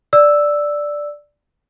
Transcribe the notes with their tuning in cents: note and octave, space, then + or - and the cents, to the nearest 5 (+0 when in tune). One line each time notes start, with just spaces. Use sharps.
D5 +0 E6 +0